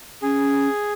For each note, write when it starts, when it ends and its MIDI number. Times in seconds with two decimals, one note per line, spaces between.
0.22 0.68 61
0.22 0.93 68